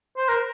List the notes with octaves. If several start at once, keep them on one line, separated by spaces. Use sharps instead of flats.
C5
A#4